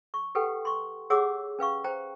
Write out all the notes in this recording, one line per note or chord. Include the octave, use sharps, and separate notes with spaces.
C#6
G4 A4 B4 F#5 G5
C6 C#6
G4 G#4 C#5 F#5 D6 E6
C#4 B4 F5 C#6
C5 G5 A#5